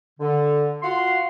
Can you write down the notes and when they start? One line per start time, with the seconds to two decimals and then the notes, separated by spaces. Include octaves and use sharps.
0.20 D3
0.82 F4 F#4 F5 F#5 C6